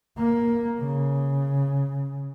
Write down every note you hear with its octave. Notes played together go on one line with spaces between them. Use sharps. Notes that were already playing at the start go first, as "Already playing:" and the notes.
A#3
C#3